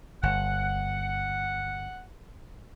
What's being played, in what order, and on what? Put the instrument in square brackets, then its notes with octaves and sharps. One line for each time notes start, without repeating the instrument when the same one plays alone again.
[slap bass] G1 [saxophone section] F#5